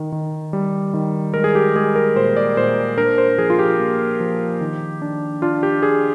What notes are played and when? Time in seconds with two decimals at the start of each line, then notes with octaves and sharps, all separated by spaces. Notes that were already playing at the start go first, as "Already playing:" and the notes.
Already playing: D#3
0.12 D#3
0.53 G3
0.94 D#3
1.34 G#3 A#4
1.44 G#4
1.55 G4
1.76 G#3 G#4
1.96 A#4
2.16 A#2 C5
2.37 D5
2.57 A#2 C5
2.98 D4 A#4
3.18 C5
3.38 F3 G#4
3.50 F4
3.59 G4
3.79 A#3
4.20 F3
4.61 D#3
5.02 D4
5.42 D4 F4
5.63 G4
5.83 D4 G#4